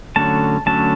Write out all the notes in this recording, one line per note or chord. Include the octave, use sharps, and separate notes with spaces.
D3 F#3 A3 C#4 A5
D3 F#3 A3 C#4 A5